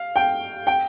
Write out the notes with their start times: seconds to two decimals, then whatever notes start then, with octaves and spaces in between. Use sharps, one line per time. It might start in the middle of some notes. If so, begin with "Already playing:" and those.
Already playing: F5
0.16 G5
0.67 G5